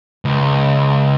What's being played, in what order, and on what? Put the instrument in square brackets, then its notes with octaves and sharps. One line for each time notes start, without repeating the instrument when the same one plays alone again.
[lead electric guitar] C#2